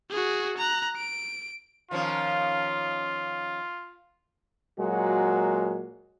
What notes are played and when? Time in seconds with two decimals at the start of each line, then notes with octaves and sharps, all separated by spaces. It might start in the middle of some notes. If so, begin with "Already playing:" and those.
0.10 F#4 G#4
0.58 A#5 F#6
0.97 D7
1.91 D#3 F3 C#4 F4
4.79 A#2 F#3 G#3 F#4